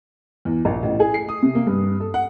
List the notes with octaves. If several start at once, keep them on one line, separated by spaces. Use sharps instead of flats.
E2
A#1
A1
G#4
C7
D#6
C3
A#3
G2
A4
F#5